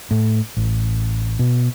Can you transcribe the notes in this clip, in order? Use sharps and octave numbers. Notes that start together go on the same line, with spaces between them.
A2
A1
B2